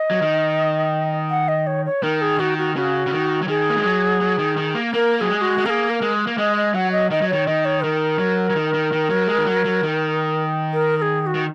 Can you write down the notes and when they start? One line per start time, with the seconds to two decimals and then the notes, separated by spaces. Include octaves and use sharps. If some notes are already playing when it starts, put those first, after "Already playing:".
Already playing: D#5
0.11 F#3
0.22 D#3
1.30 F#5
1.48 D#5
1.67 C#5
1.86 C#5
2.03 D#3 A#4
2.21 G#4
2.39 D#3 F#4
2.58 F#4
2.76 C#3 F#4
3.07 C#3
3.12 D#3
3.42 F#3
3.48 D#3 G#4
3.70 A#3
3.77 G#3
3.84 F#3
4.21 F#3
4.38 D#3
4.57 D#3
4.74 A#3
4.93 A#3 A#4
5.17 A#4
5.21 F#3 G#4
5.30 G#3
5.41 F#4
5.58 G#3
5.66 A#3 A#4
5.70 G#4
5.90 A#4
6.02 G#3
6.27 A#3
6.38 G#3 D#5
6.57 D#5
6.74 F#3 F#5
6.92 D#5
7.11 D#3 D#5
7.22 F#3
7.29 D#3 C#5
7.47 D#3 D#5
7.65 C#5
7.83 D#3 A#4
8.19 F#3
8.50 F#3
8.56 D#3
8.74 D#3
8.92 D#3
9.10 F#3
9.28 G#3
9.38 D#3
9.46 F#3
9.65 F#3
9.83 D#3
10.73 A#4
10.97 A#4
11.02 G#4
11.21 G#4
11.26 F#4
11.35 D#3